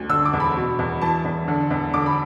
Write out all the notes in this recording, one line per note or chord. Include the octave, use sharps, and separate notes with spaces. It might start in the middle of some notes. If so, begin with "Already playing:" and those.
Already playing: D2
D3 E6
D6
E2
B5
B2
E2
E3 A5
E2
D3
E2
D3 D6
B5